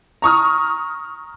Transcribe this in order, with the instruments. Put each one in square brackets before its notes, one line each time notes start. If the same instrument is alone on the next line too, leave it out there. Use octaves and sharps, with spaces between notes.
[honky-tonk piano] A#5 C#6 D#6 F6